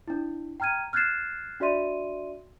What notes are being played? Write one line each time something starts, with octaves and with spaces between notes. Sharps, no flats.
D4 E4
G5 A#5 F6 G#6 D#7
F6 F#6 G#6 A6 C7 E7
D4 F#4 D5 E5 C6 D#7